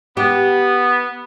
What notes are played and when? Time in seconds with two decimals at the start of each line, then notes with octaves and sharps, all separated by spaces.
0.17 B3 G4